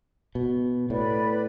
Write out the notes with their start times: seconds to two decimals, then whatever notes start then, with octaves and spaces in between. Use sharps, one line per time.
0.35 B2
0.89 A2 B4 D5 B5